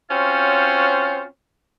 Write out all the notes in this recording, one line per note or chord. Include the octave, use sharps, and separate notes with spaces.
C4 C#4 F4 F#4 C5 C#5